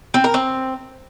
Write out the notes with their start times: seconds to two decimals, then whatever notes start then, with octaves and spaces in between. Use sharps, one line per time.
0.14 C4
0.24 A#4
0.34 C4